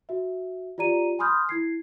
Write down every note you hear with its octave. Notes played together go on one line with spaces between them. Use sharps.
F#4 E5
F4 G4 D5 A#5 D#7
G#5 B5 C6 D#6 F6 G6
E4 G#6 C7